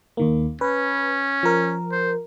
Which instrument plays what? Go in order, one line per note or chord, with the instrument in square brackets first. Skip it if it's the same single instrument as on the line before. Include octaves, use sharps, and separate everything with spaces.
[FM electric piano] D#2 D#3 A#3
[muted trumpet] C#4 [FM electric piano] B4
[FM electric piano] F3 A#4
[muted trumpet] C5